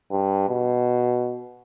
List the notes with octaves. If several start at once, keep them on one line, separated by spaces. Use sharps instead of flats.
G2
B2